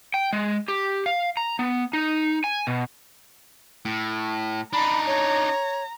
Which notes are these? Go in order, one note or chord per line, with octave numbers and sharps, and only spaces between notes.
G5
G#3
G4
F5
A#5
B3
D#4
G#5
B2
A2
D4 D#4 A#5 B5
C#5